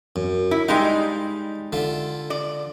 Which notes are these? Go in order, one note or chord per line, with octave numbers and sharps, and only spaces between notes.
F#2
E4
G3 G#3 D#4 F5
D3 F4 E5
D5